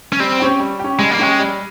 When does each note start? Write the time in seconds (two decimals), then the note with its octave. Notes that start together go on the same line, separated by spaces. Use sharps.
0.12 C#4
0.20 G3 C4
0.39 C#4 G4
0.59 G3
0.79 C#4 G4
0.99 G3 G#3
1.11 A#3
1.19 G#3 C#4 G4
1.39 G3